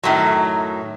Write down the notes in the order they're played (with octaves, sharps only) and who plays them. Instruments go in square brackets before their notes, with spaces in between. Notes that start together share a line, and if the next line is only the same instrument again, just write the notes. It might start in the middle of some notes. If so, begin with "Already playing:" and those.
[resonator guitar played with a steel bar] F#2 A2 D#3 F#3